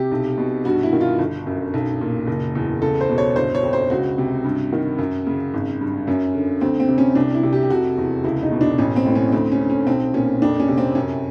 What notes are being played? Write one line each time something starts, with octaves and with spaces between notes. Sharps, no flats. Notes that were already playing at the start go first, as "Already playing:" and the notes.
Already playing: C3 G4
B1
B2
G2 F#4
E4
D#3
F4
G1
F#2
B1
A#2
F#1
E2
C#2 A4
C5
B2
C#5
G1 C5
C#5
F2
C5
C#2 F#4
C3
G2
D#3
F#2
C#3
G#1
G2
F#2 C#4
D3
D2 C4
C4
C3
C#4
C2 D4
E4
C3
G4
G4
F1 F#4
E2
C#2 E4
D#4
B2
D4
A1 C#4
C4
A2
C#4
D2 C4
C#4
D3
C#4
B1 C4
A#2 C#4
F2 D4
C#4
C3
C4
F#2 C#4